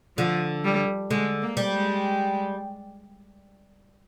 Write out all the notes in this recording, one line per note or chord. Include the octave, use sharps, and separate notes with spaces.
D3 F3
G3
D3 G#3
A#3
G3
G#3